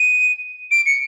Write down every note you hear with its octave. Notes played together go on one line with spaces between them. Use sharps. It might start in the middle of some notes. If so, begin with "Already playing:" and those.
Already playing: D#7
D7
C#7